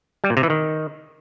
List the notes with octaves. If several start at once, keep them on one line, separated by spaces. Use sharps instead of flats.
G3
A#2
C3
E3
D#3